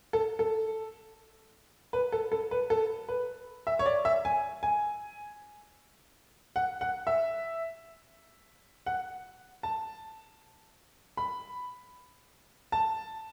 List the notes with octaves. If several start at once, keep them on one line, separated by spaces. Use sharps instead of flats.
A4
A4
B4
A4
A4
B4
A4
B4
E5
C#5
D5
E5
G#5
G#5
F#5
F#5
E5
F#5
A5
B5
A5